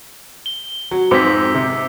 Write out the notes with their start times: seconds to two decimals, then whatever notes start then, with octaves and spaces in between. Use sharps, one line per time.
0.46 G7
0.91 F#3
1.11 F2 G#2 C4 D6 E6 B6
1.54 C3